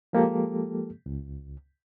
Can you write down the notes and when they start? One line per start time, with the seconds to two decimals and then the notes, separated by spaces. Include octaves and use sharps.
0.13 F3 G#3 A#3 G4 A4
1.06 C#2